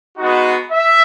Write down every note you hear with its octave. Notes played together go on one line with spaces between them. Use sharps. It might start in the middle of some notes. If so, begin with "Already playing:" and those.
G#3 B3 D#4 F#4
E5